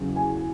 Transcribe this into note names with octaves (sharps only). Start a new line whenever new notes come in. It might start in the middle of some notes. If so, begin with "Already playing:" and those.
Already playing: E2 C#3 F#3
G#5